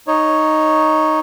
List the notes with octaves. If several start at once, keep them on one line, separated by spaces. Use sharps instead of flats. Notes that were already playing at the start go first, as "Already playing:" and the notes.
D#4 C#5